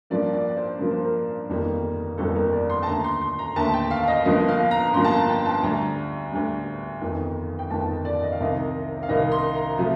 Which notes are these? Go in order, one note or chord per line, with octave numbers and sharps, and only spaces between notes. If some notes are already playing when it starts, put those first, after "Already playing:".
G2 F3 A#3 D5
D5
D5
C5
G2 F3 A#3 A#4
C5
A#4
G1 F2 D#3 G3 A#3
G1 F2 D#3 G3 A#3 A4
A4
A#4
D5
C6
A5
D#2 D3 A3 A#5
C6
C6
A#5
D#2 D3 A3 A5
G5
F5
D#5
G1 G2 F3 A#3 D#5
F5
A#5
G1 G2 F3 A#3 C6
A5
A#5
G5
A5
D2 D3 G3 A#5
D2 D3 G3
G1 F2 D#3
G5
G1 F2 D#3 A5
D5
D#5
F5
C2 C3 D#3 D#5
F5
C2 C3 D#3 D#5
C6
A#5
C3 F3 A3